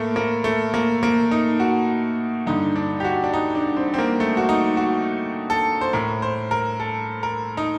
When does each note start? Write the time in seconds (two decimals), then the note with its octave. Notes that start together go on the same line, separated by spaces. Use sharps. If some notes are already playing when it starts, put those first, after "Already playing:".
Already playing: A2 A3 A#3
0.16 A#3
0.44 A3
0.74 A#3
1.03 A#3
1.31 D#4
1.60 F#4
2.47 G2 D3 D#4
2.76 D4
3.00 G4
3.04 F#4
3.24 D4
3.33 D#4
3.55 D4
3.76 C4
3.94 C4
3.98 A#3
4.20 A3
4.37 F#4
4.49 D#4
4.77 F#4
5.50 A4
5.81 C5
5.93 A2 A#4
6.22 C5
6.51 A#4
6.80 A4
7.23 A#4
7.57 D#4